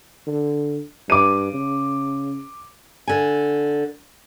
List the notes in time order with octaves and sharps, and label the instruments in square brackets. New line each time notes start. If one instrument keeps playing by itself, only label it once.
[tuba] D3
[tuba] G2 [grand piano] D6 D#7
[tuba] C#3
[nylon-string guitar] D3 G#5